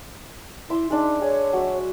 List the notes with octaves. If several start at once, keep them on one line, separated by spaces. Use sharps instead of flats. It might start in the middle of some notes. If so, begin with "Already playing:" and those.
E4 E5 C6 D6
G#3 D4 D#4
G#4 C#5
F#3 E5